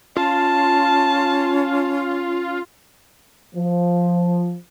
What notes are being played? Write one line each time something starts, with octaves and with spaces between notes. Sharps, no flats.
C#4 F4 A5
F3